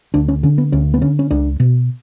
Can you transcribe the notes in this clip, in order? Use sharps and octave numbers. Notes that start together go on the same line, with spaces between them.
D2 D4
C#4
D3 C#4
B3
D2 C#4
B3
D3 C#4
C#4
C#2 D4
B2